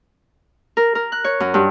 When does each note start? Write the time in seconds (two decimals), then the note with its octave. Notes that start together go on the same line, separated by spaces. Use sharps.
0.77 A#4
0.95 A#4
1.12 F#6
1.24 C#5
1.40 F#2
1.54 G2